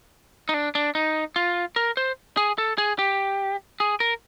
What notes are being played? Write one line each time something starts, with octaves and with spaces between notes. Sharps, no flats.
D#4
D4
D4
D#4
F4
A#4
C5
G#4
A4
G#4
G4
G#4
A#4